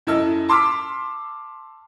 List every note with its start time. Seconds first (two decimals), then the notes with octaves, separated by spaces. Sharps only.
0.07 F#2 E4 A4 D#5 E6
0.49 A5 C6 D6 E6 F6 B6